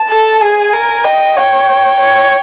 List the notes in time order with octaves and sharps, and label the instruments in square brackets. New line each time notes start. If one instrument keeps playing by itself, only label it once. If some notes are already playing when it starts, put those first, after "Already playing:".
Already playing: [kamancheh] A5
[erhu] A4
[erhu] G#4 [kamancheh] G#5
[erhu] A#4
[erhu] D#5 [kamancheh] G5
[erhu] C#5 [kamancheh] G5
[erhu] C#5